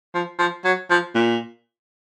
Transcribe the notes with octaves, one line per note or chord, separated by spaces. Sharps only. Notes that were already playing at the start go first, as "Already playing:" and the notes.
F3
F3
F#3
F3
A#2